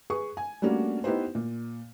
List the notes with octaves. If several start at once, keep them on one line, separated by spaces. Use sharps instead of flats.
G#4 B4 C#6
G#5
G3 A3 A#3 C#4 D4 F#4
B3 D#4 E4 G4 B4 C5
A#2